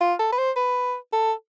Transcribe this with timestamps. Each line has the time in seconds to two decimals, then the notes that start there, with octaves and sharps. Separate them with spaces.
0.01 F4
0.20 A4
0.33 B4
0.38 C5
0.56 B4
1.13 A4